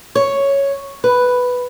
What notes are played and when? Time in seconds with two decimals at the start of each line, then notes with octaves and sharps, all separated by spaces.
0.15 C#5
1.04 B4